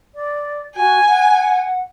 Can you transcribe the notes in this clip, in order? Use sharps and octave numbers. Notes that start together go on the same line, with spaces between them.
D5
F#4 G#5
F#5